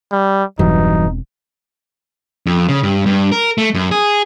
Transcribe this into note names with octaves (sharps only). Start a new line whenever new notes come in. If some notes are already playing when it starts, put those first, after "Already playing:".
G3
E1 G2 E3 F#3 C4 D#4
F2
C#3
G2
G2
A#4
A3
F#2
G#4